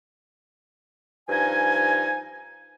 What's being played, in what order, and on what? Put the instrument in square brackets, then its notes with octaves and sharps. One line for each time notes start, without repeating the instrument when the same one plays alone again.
[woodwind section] G2 F3 D#4 G#5